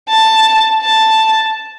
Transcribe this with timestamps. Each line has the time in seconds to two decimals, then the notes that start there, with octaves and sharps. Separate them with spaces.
0.09 A5
0.82 A5